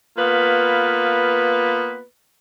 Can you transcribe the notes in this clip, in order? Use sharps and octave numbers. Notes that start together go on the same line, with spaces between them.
A#3 B3 F4 B4